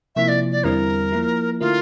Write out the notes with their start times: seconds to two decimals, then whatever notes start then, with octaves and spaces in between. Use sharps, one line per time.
0.16 C3 F3 A#3 E4 E5
0.28 D5
0.52 D5
0.64 E2 D3 G3 C4 E4 A#4
1.12 F3 A#3 E4
1.60 D3 A3 E4 F4 A#4